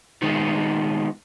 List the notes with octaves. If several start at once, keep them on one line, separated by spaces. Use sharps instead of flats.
D#3 G#3 B3 D#4 F4